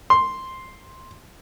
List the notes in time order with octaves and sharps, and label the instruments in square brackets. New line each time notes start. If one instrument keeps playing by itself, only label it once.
[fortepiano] C6